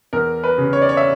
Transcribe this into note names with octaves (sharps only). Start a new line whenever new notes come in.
E2 A#4
B4
C#3
C#5
D5
C#5
E5